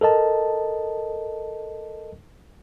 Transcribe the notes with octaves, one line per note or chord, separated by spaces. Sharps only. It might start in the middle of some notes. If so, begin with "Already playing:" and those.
A4 A#4 D#5 A5